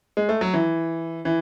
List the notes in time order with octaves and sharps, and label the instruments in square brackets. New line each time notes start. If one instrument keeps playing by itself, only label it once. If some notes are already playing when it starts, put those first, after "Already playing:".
[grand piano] G#3
A3
F#3
E3
E3